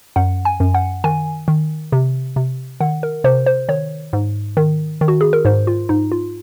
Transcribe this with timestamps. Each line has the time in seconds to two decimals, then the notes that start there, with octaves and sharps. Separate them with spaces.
0.16 F#2 F#5
0.45 G#5
0.60 F#2
0.74 F#5
1.04 D#3 G#5
1.48 D#3
1.92 C3
2.36 C3
2.80 D#3 F#5
3.03 A#4
3.24 C3 C5
3.46 C5
3.69 D#3 C#5
4.13 G#2
4.57 D#3
5.01 D#3
5.08 F#4
5.21 G#4
5.33 A#4
5.45 G#2 C5
5.67 F4
5.89 G#2 D#4
6.12 F4